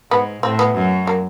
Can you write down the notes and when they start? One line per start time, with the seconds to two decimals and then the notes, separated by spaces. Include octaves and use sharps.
0.11 G#2 B3
0.43 A2 C4
0.59 B3
0.75 F#2
1.07 A#3